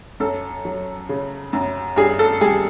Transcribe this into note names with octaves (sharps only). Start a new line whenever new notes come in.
F#2 A4
F#3
C#3
F#2
G2 G#4
A4
G3 G#4